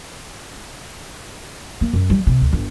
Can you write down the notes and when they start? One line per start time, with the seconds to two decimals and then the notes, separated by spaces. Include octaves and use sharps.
1.81 A#3
1.93 F#2
2.10 G3
2.27 C3
2.41 D2
2.53 G1